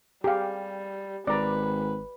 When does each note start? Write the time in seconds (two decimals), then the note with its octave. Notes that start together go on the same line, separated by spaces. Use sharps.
0.24 G3 G4 G#4 F5
1.27 G#1 B4 D5 A#5